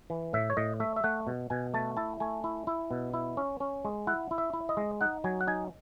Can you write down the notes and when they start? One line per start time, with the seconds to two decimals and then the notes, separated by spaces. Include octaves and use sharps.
0.10 E3
0.33 A2 E5
0.50 C#5
0.57 A2 D#5
0.80 A3 E5
0.96 E5
1.04 A3 F#5
1.27 B2
1.50 B2 G#5
1.74 A3 A5
1.97 E4 A5
2.20 A3 G#5
2.44 E4
2.67 E4
2.91 B2
3.14 E4
3.37 C#4
3.60 C#4
3.85 G#3
4.07 E4 F#5
4.31 E4
4.38 E5
4.53 E4
4.69 D#5
4.77 G#3
5.01 D#4 F#5
5.24 F#3 G#5
5.41 F#5
5.47 D#4 G#5